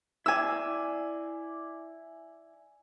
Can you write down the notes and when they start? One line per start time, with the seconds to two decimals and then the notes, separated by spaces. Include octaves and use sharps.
0.26 E4 D5 G#5 E6